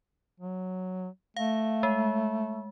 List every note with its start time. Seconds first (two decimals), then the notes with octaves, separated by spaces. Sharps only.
0.40 F#3
1.37 A3 F5
1.83 G#3